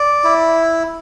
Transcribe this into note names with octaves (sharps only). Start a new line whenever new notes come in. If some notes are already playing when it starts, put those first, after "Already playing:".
Already playing: D5
E4